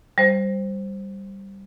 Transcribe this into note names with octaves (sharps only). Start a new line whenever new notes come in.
G3 C5